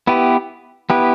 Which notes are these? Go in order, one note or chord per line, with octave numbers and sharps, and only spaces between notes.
B3 E4 G4 B4
B3 E4 G4 B4